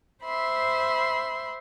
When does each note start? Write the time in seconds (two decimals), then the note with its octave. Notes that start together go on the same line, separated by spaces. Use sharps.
0.23 C5 E5 B5 C6